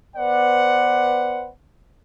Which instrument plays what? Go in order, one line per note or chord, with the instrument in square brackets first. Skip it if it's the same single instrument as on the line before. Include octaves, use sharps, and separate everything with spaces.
[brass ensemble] B3 B4 C5 D5 F#5